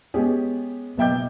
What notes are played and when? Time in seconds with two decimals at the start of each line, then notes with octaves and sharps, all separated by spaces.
0.14 G#3 B3 C#4 G4 G#4
0.97 F#1 B2 E5 G5 D6 G6